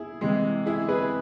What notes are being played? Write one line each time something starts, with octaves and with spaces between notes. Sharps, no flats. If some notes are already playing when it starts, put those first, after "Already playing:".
Already playing: E4 G#4
C3 E3 G#3
E4 G#4
G#4 B4